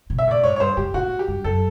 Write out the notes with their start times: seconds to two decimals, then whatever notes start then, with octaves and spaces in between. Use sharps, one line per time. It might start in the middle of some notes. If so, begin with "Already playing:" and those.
0.10 B2
0.19 E5
0.27 A2 D5
0.44 G#2 C#5
0.56 C#5
0.60 G2 C5
0.77 G#2 G4
0.94 A2 F#4
1.19 G4
1.28 G2
1.44 F#2 A4